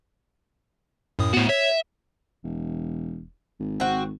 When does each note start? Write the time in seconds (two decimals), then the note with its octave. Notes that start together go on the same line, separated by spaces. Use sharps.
1.19 F#2 A2 D#6
1.34 A2 A3 B3 F#4
1.49 C#5 E5
2.44 E1
3.60 G#1
3.80 C4 F#4